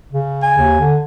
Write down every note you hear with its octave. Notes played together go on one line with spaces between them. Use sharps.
C#3
G#5
D#2
D3